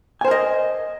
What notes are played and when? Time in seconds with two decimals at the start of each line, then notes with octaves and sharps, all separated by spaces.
0.21 G#5
0.25 C5
0.28 A#4
0.31 D#5